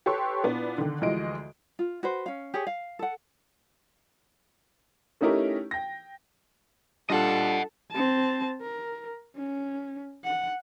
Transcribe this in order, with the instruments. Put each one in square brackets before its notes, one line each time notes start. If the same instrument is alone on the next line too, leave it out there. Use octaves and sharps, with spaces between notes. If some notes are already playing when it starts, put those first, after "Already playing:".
[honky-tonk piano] G4 A4 B4 C#5 C6 C#6
A#2 B3 D4 E4
D3 D#3
D2 E3 F3 G#3 D#5 D7
[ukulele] F4
F#4 B4 C5
C#4 F5
G4 G#4 C#5
F5
A4 F#5
[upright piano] A3 C#4 D#4 E4 G4 A#4
G5 A#6
[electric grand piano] G3 D4 F4 [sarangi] A4 [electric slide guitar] D#5 F#5
[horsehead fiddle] C4 A5
A#4
C#4
F#5